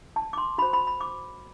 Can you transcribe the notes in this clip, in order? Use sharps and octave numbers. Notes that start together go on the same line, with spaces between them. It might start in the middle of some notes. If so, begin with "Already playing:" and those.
A5
D6
C6
F#4 C5 B5
B5
B5
D6